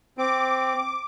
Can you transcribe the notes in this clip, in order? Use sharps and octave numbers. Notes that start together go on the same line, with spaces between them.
C4 D6